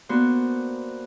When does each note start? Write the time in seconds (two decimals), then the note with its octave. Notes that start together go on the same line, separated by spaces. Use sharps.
0.09 A#3 B3 D4 F#4 C5